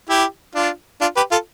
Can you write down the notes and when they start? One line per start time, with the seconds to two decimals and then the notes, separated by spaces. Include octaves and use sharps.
0.10 E4 G4
0.55 D4 F4
1.01 D4 F4
1.16 G4 B4
1.31 F4 A4